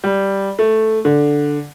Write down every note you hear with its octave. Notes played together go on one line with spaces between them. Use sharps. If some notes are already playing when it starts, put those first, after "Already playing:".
G3
A3
D3